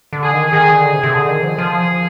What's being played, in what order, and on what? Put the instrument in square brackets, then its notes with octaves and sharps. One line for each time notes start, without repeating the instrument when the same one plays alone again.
[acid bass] D3
[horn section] G#4
[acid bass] D#3
[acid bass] D#3 [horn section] G#4
[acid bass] D3
C3
C3
[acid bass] D3 [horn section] G#4
[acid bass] D#3
F3
F3